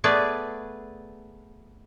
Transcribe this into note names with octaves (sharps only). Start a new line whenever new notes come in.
A3 B3 G#4 B4 D5